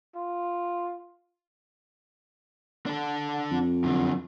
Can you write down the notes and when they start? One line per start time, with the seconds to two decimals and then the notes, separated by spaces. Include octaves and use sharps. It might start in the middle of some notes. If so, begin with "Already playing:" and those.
0.15 F4
2.86 D4 A4
3.51 F2
3.84 F#2 D3